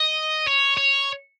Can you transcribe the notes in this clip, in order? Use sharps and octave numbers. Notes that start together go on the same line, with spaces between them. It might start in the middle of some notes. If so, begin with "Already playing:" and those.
Already playing: D#5
C#5
C#5